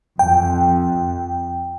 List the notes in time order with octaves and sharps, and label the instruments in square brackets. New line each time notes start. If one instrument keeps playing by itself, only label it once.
[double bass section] F2 [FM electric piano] G5